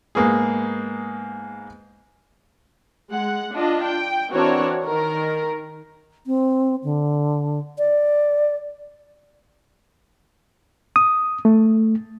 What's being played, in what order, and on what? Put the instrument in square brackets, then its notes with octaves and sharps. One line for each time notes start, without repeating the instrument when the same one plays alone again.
[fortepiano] G#2 A#3 B3 G#4
[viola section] G#3 F#5
D4 F4 D#5
G5
E3 C4 D4 F#4 A#4 C#5
D#3 A#4
[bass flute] C4
D3
D5
[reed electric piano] D#6
A3